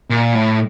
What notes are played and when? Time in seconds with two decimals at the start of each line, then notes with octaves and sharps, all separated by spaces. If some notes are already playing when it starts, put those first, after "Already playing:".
0.10 A#2
0.35 A2